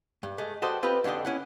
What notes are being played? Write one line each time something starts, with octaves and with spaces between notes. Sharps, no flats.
G2
G#3 A3
F#4 G4 A4 C5 D5 D#5
C4 F4 G4 B4 D#5
F2 D3 D4 G4 D#5
C#4 E4 F#5